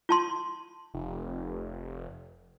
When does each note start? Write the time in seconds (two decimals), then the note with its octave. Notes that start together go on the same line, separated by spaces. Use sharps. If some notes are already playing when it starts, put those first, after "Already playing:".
0.09 F4 A5 C6
0.94 F1